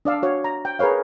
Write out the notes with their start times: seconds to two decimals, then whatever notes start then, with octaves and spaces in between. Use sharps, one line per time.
0.05 D4 D5 F5 E6
0.23 F#4 C#5 F5
0.44 A#5
0.65 G5
0.79 G#4 A#4 B4 C#5 F5